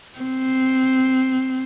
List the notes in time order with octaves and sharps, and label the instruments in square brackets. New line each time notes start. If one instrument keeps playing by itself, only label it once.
[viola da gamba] C4